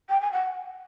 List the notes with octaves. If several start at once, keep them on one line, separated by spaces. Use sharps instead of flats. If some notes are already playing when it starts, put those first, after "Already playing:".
G5
G#5
F#5